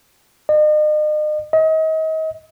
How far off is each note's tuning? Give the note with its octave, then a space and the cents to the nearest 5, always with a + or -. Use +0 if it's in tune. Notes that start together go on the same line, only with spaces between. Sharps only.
D#5 -40
D#5 +35